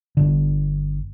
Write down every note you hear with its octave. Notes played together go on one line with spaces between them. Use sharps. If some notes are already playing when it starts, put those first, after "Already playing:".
G1 D3